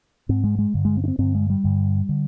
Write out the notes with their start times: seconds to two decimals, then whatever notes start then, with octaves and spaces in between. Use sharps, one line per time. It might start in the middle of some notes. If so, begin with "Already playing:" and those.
0.29 G#2 C4
0.44 G#3
0.59 G#3
0.74 G2 D3
0.85 G#3
0.97 C4
1.04 D4
1.08 C4
1.19 G2 D3 C4
1.35 G#3
1.50 G3
1.64 G2 D3
2.09 D3